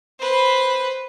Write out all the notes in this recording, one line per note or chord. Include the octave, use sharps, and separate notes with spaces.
B4 C5